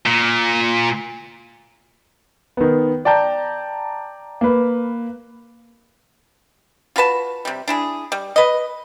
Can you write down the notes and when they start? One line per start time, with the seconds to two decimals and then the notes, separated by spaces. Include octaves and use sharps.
0.06 A#2
2.57 D#3 B3
3.05 D5 G5 A5 A#5 G6
4.41 A#3 B4
6.96 F4 F#4 B4 A5
7.45 C3 G3
7.68 D4 E4 G#4
8.12 G3
8.36 B4 D#5